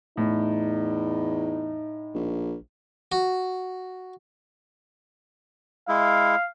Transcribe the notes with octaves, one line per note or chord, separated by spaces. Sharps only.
E2 A2 D#4
A#1
F#4
G#3 E4 F5